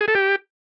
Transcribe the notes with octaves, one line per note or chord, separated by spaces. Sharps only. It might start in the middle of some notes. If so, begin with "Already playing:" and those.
G#4
A4
G4